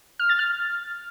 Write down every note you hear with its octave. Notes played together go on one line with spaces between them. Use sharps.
F6
A6
F6